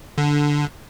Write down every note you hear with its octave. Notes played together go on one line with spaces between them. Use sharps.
D3